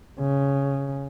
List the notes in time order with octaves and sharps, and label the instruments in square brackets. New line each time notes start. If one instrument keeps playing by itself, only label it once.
[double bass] C#3